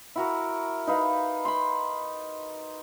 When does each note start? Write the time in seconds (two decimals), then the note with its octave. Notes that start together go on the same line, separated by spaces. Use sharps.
0.16 E4 F#4 A#4
0.87 D#4 B4 F5
1.45 B5 C6